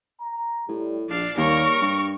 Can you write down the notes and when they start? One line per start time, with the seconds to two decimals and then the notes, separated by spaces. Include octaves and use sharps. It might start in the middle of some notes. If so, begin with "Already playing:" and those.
0.20 A#5
0.69 A2 G3
1.09 A#1 D4 F5
1.37 D#2 G3 A#3 A#4 C#5 C#6
1.81 G2